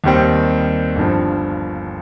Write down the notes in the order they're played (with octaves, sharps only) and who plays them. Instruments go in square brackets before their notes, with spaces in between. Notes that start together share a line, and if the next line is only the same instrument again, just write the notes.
[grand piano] D#2 D#3 G3 C4
G1 G2 F3